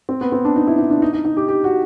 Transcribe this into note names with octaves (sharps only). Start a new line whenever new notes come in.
C4
B3
C4
D4
D#4
E4
D#4
D4
D#4
D#4
D#4
G4
G4
F#4